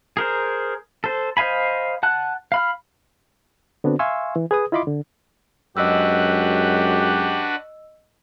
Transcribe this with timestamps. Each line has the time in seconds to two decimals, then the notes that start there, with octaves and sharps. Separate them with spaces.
0.17 G#4 A#4 C5
1.04 A4 C5
1.37 C5 D#5 F5 G#5 B5
2.03 F#5 A5 F#6
2.52 F5 B5 F6
3.84 D3 B3 C4 D4 F#4
3.99 E5 F5 G#5 C6 C#6 E6
4.36 E3
4.51 G#4 B4 D#6
4.72 E4 F4 D#5 B5 C6 D6
4.87 D3
5.77 F#2 G#3 D4 F#4 G4 B4 D#5 E6